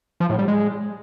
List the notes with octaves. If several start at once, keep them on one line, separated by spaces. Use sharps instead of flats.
F3
A2
G3
G#3